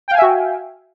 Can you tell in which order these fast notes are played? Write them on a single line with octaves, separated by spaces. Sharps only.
G5 F5 G#5 E5 F#4